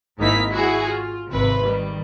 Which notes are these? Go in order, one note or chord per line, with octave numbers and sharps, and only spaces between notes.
G#1 G#2 A#3 D#4 E4 B6
E4 F#4 G#4
F4
G#1 C3 C4 B4
D#3 G3